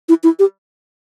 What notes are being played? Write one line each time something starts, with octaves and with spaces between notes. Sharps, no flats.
E4
E4
G4